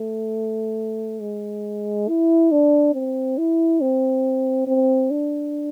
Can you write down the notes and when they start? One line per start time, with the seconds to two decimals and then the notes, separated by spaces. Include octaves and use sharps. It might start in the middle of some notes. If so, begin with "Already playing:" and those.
Already playing: A3
1.21 G#3
2.08 E4
2.51 D4
2.94 C4
3.38 E4
3.81 C4
4.67 C4
5.11 D4